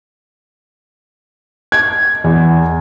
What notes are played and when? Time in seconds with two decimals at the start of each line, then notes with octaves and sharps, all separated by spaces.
1.72 G#6
2.24 E2